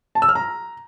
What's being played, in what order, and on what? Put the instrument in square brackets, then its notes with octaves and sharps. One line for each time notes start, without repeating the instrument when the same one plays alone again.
[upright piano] A5
E6
F6
A#5